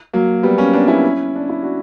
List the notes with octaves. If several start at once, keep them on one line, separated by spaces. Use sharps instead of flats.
F#3 A#3
G3 B3
A#3 C#4
B3 D4
C#4 E4
D4
E4
D4 F#4